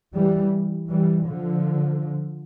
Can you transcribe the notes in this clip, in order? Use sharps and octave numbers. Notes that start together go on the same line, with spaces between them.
E3 G3
E3 G3
D3 F3